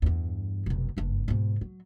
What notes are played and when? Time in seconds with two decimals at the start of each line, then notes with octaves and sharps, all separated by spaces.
0.02 E2 G2
0.66 F1 B1
0.97 F#1 G2
1.28 G#2 B2
1.61 F#3